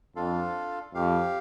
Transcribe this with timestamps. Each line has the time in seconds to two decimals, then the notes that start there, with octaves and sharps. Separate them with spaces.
0.16 F2 D4 F4 A4 F5
0.94 F2 G4 F5